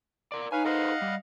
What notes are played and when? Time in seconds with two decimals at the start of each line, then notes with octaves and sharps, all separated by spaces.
0.32 A#4 D5
0.52 D#4 B4 C#5 F5 G#5
0.65 A4 B4 C5 D#5 F5 F#5
1.02 G3